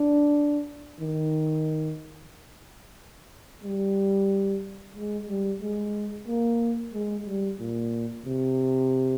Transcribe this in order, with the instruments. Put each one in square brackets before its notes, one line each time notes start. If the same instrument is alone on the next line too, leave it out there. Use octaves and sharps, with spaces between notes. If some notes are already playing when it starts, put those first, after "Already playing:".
Already playing: [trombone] D4
D#3
G3
G#3
G3
G#3
A#3
G#3
G3
A#2
C3